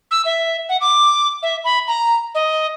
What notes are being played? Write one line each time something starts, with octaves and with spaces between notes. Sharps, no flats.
E6
E5
F#5
D6
E5
B5
A#5
D#5